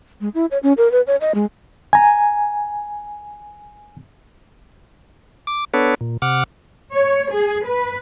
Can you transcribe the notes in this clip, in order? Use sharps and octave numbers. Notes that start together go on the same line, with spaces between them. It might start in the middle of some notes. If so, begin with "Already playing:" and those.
G#3
E4
C#5
C#4
A#4
B4
C#5
D#5
G#3
G#5 A#5
D6
B3 D4 A4 B4 C#5
A#2
C3 F#5 D6 F6
C#5
G#4
B4